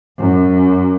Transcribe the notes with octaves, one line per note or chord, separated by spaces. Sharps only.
F#2